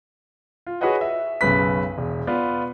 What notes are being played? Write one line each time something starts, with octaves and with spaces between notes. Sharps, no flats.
F4
F#4 G#4 B4 C#5 D#5 F#5
E5
B1 F#2 C#3 B4 B6
E1
B3 F4 D5